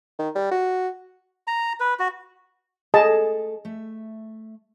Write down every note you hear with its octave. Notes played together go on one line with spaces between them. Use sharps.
D#3
G3
F#4
A#5
B4
F#4
A3 G#4 A4 D#5 A5
A3 E5